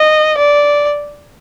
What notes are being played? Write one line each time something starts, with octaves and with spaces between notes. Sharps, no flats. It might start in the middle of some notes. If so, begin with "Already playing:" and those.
Already playing: D#5
D5